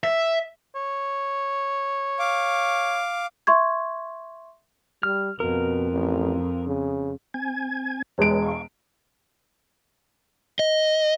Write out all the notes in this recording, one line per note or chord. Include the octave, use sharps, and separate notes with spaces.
E5
C#5
F5 D6
E5 C6 C#6 G#6
G3 F6
F2 B2 A#4
A1
C#3
C4 G#5 G#6
E1 G#3 B4 C#5 D7
F5 C#6
D#5